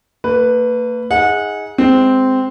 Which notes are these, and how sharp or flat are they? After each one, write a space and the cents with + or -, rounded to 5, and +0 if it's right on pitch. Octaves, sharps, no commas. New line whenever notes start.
A#3 -45 B4 +0
D#4 +30 G#4 -5 F#5 -25
G#3 +0 C4 -10